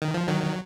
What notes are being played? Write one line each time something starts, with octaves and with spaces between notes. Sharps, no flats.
D#3
F3
D#3 F#3